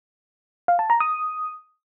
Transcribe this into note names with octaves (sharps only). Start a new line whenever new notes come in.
F5
A5
A#5
D#6